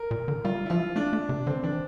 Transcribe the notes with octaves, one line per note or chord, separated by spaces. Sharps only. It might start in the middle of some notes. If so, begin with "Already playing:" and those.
Already playing: A#4
A#2
D3
G3 F4
E4
F3 F4
A3 D4
A3
C3
D3 C4
E3 D4